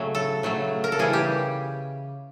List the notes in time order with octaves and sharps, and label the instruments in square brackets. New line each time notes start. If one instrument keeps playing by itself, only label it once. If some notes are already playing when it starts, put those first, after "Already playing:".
Already playing: [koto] C#3 F#3 A3 F#4
A4
C#3 F#3 A3
A#4
A4
C#3 E3 G3 G#4
G4